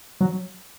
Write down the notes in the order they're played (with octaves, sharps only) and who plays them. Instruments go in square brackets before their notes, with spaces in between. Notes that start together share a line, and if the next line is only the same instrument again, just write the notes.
[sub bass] F#3